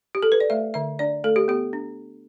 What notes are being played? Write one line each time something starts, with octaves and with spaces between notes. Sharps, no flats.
G4
A4
B4
D5
A3 E5
D3 E5
D4 D5
A3 A4
G4
B3 G4
D4